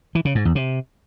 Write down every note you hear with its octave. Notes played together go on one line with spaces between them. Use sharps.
E3
C#3
G#2
E2
C3